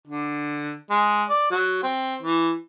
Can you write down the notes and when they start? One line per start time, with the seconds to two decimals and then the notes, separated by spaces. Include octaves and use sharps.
0.07 D3
0.90 G#3
1.29 D5
1.51 F#3
1.83 C4
2.22 E3